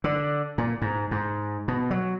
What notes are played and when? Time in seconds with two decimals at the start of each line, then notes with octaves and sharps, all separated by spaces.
0.04 D3
0.58 A#2
0.82 G#2
1.11 G#2
1.68 B2
1.91 F#3